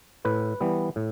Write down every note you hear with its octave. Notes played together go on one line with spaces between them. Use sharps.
A2 B4
E3 G3 B3
A2